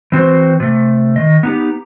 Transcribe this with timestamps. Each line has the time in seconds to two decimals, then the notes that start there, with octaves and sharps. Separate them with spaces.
0.12 E3 C4 F#4 C5
0.60 C3 A3
1.16 D#3 F3 D#5
1.43 B3 D#4 G4